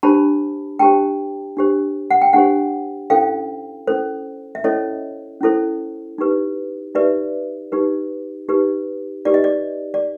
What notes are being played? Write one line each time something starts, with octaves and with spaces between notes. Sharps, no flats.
D4 G4 C5 A5 B5
D4 G4 C5 G5 A5
D4 G4 C5
F#5
G5
D4 G4 C5 F#5 G#5
C#4 E4 A4 C5 F5 G5
C#4 E4 A4 C5
E5
C#4 E4 A4 C5 C#5 D#5
C#4 E4 A4 C5
D#4 G4 B4
D#4 G4 B4 D5 E5
D#4 G4 B4
D#4 G4 B4
D#4 G4 B4 D5
D#5
D5
D5